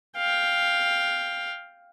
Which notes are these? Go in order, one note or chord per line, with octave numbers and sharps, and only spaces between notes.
F5 G5